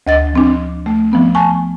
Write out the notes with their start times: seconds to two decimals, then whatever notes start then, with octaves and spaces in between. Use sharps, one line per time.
0.07 D2 D#5 A6
0.33 F3 C4 D4
0.86 A3
1.12 F3 B3 C4
1.35 G#5 A5 C#6